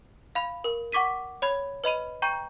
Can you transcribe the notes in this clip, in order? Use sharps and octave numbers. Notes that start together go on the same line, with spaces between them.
F5 B5
A#4
F#5 C#6 D6 B6 D#7
C#5 B5 G#6
B4 D#5 B5 D#7
G5 A#5 C#6 G6 D#7